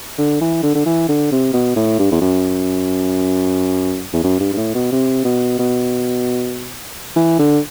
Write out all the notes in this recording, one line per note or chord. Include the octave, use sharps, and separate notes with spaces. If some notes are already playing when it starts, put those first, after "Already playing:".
D3
E3
D3
D3
E3
D3
C3
B2
A2
G2
E2
F#2
E2
F#2
G2
G2
A2
B2
C3
B2
B2
E3
D3